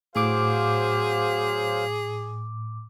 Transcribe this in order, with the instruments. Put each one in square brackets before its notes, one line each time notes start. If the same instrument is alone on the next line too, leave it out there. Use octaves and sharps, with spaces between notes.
[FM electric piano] A2 D6 [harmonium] F#3 C5 F5 [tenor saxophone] G#4